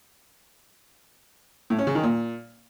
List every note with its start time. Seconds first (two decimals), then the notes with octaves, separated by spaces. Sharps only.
1.70 A2
1.79 C#4
1.87 C#3
1.95 D#3
2.03 A#2